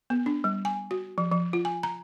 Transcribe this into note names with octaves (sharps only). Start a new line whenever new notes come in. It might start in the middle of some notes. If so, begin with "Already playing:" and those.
B3
D4
G3
G#5
F#4
F3
F3
F4
G#5
A#5